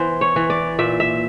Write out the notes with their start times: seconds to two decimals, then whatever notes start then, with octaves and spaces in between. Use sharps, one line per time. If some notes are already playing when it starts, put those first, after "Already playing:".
Already playing: E3 B3 C5
0.21 C#5
0.36 E3
0.50 D5
0.79 A#2 E5
1.00 E5